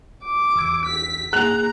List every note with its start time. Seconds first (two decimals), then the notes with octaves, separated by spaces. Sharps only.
0.24 D6
0.56 E2 E6 G#6
0.85 B6
1.33 A#3 G#4 A#5 F#6 F7